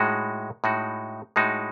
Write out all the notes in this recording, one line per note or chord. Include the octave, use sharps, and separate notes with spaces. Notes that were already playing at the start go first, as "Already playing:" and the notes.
Already playing: A2 G#3 D#4 F#4
A2 G#3 D#4 F#4
A2 G#3 D#4 F#4